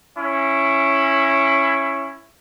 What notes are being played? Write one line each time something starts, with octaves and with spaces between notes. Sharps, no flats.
C#4 E4